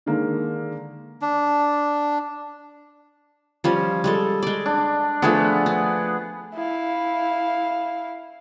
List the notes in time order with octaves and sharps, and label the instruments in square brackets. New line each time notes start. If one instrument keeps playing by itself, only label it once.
[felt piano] D3 D#3 G#3 A#3
[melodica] D4
[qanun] F3 G3 C#4
G3 G#3 A4
G#3 D5
[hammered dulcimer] D4
[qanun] F3 A3 D4 [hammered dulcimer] B3 G#4
[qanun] D4
[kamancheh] E4 F5